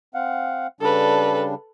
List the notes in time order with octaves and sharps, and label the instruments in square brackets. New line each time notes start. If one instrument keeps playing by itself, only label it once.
[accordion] C4 F5 F#5
[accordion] C#3 G3 D4 [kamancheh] A4 B4